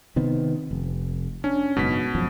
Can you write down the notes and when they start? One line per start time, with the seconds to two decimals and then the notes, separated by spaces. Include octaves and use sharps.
0.16 C3 D#3 B3
0.71 F1
1.44 C#4 D4
1.77 F#1 G#2 B2 B6
2.15 G#1 F#2 F3